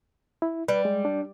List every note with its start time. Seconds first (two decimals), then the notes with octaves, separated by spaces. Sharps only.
0.42 E4
0.68 G3 B4
0.85 G#3
1.05 D4